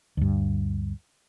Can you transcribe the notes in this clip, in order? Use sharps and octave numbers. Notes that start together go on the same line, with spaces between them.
D2 G2